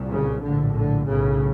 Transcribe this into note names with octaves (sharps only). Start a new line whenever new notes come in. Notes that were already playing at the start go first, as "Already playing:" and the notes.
Already playing: C2 A#2
C#3
A#1 A2 D3
D3
B1 A2 C#3